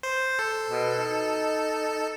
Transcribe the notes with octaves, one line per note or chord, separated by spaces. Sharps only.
C5
A4
B2
D#4